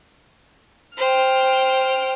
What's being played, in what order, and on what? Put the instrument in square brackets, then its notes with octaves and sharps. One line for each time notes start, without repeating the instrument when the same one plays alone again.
[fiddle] C5 [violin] G5 F6